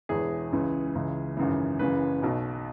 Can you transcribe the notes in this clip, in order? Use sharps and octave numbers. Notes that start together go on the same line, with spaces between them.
E1 E2 E3 G#4
C#2 C#3 E3
C#2 C#3 E3
G#1 F#2 C#3 E3
F#1 F#2 C#3 E3 B4
B1 B2